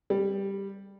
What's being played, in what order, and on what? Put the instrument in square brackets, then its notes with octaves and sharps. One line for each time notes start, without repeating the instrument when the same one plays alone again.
[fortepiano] G3